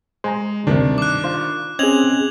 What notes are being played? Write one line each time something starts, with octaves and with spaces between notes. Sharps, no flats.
G#3 C5 G#5 A#5
D2 G2 C3 D#3 D4
D6 F#6
F4 C5
C4 C#4 G#4 D#5 G#6 F7 F#7